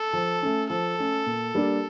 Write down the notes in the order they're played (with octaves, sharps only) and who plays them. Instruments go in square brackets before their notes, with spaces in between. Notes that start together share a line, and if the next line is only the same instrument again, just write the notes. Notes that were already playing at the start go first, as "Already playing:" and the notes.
Already playing: [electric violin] A4
[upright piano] F3
A3 C#4
[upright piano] F3 [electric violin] A4
[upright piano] A3 C#4
A#2
G3 A#3 D4